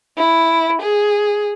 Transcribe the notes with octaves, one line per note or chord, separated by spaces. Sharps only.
E4
G#4